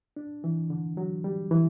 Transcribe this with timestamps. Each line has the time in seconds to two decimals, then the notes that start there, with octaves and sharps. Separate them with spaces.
0.16 D4
0.44 E3
0.70 D3
0.97 F#3
1.24 G3
1.51 E3